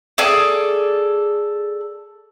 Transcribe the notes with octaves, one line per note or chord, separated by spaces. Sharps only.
G#4 A4 D5